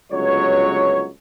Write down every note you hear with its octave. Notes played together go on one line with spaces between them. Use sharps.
G1 C#2 F#3 C#5